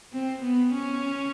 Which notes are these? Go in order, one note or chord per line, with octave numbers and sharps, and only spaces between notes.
C4
B3
C#4